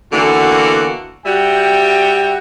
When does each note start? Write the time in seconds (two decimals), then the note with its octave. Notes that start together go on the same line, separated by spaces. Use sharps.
0.13 D3 E3 A#3 B3 F#4
1.26 G3 F#4 E5 G5